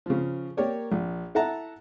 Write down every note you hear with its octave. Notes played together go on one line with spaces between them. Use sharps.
C#3 F3
A#3 G4 A#4 C#5 D5
A#1
E4 A4 E5 F#5 A5 A#5